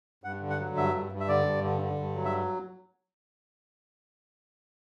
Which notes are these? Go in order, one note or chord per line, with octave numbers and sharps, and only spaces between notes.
G2 F#5
D3
F#5
F#3
G2 E5
G2
G2
E5
D3 D5
G2
D3
D3
G2
F#3
E5